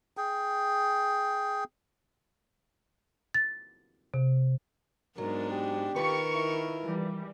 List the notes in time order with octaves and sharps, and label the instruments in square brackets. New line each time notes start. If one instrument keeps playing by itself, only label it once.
[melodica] G#4 G5
[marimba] A6
C3
[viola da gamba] G#2 B3 D4 [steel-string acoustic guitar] F#3 [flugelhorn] A#4
[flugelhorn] G4
[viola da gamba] D#3 A#4 [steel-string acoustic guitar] F4 B4 [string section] C#6
[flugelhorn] E4
[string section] E3 G3